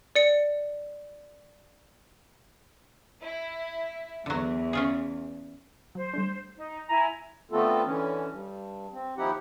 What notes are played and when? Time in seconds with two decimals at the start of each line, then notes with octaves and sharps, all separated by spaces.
0.16 D5 C#7
3.22 E4
4.26 E2 D3 F#3
4.73 C#4 F4 G#4
5.95 F#3 C5
6.13 G3 A3 D4
6.57 D#4
6.89 E4 G#5 A#5
7.51 D3 A3 B3 C4 F4 A4
7.85 D3 E3 C#4
8.29 G2
8.92 C4
9.17 D#2 F3 D#4 E4 G4 F#5